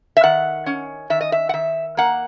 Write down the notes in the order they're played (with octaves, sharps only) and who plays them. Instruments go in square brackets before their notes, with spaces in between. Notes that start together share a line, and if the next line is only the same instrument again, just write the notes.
[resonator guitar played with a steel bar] E5
D#3 F#5
C#4
D#3 E5
D#5
E5
F#5
D#3 E5
A#3 F#5